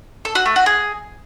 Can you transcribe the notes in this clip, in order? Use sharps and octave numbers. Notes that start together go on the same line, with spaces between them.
A4
F#4
A3
F#4
G#4